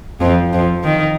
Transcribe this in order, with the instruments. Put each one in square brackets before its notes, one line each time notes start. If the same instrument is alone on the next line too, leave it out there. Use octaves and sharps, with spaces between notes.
[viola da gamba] F2 F3
F2 F3
D#3